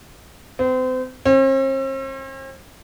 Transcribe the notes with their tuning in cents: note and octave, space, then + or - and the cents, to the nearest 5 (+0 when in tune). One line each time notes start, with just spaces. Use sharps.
C4 -35
C4 +45